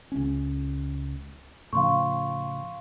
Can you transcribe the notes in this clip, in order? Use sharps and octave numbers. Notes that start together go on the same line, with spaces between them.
C#2 C#4
A2 C#3 F3 F5 C6 C#6